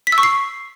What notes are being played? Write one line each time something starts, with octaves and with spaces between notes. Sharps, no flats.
B6
E6
C#6
C7